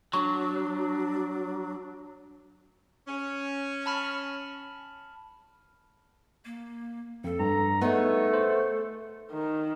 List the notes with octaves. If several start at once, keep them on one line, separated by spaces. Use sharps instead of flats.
F#3 D4 C#6
C#4
A5 B5 F6
A#3
F2 A4
G2 A#5
A3 B3 D#4 G#4 A4 C#5
C5
D#3